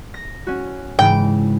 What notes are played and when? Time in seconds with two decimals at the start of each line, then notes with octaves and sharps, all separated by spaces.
0.14 A#6
0.47 C#4 F#4
0.99 G#2 C#3 E3 G5